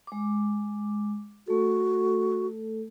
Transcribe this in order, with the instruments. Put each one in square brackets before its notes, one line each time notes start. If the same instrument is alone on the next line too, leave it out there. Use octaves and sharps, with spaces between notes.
[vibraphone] G#3 D6
[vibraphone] A3 A4 [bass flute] F#4